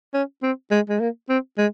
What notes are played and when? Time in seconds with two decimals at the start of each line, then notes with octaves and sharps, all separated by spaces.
0.14 C#4
0.43 C4
0.71 G#3
0.90 G#3
1.00 A#3
1.29 C4
1.58 G#3